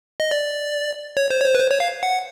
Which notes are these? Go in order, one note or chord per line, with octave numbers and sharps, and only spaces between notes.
D#5
D5
C#5
C5
C#5
C5
B4
C5
C#5
F5
F#5